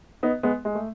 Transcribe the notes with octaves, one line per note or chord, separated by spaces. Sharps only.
B3 D#4
G#3 B3
G#3
A3